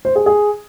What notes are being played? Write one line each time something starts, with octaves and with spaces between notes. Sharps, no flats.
C5
G#4
G#4